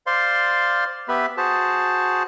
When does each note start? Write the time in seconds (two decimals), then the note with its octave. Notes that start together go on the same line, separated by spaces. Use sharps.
0.07 C5 D5 F5 C6
1.09 B3 G4 B4 E5 B5
1.37 F#4 G#4 C5 A5